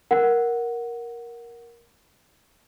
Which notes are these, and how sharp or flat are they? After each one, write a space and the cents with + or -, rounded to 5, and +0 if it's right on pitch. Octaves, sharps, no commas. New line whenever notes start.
A#4 +10 F#5 +0